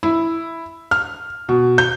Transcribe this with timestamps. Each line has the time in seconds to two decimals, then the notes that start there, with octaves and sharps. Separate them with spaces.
0.03 E4
0.91 F6
1.49 B2
1.78 G6